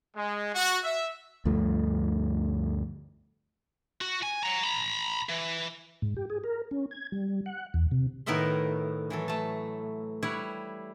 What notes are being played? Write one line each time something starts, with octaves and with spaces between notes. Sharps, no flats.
G#3
F#4
E5
D2 G2 F3 A3
F#4
G#5
F#5 A#5
A#5 B5
E3
G#2
G4
G#4
A#4
C#4
G#6
G3
F#5
E2
C3
A2 D#3 B3 A#4 E5 C6
E3 F#3 A4
A3 A5
G3 E4 C#5 F#5